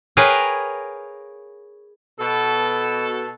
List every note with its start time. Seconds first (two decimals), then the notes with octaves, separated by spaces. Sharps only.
0.17 G#4 A#4 B4 C#5 F5 G5
2.19 B2 A4